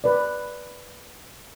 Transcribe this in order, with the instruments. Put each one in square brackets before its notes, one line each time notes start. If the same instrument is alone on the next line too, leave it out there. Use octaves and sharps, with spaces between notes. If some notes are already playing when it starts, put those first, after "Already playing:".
[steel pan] B4 D5